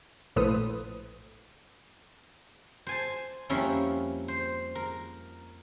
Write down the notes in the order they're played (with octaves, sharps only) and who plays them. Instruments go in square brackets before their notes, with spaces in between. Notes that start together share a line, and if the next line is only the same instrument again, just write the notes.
[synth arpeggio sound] A#1 A2 A4 B4 C5 D#6
[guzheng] C5 G#5 A5
F2 F3 G3 A#3 C#4 E4
C5
A#4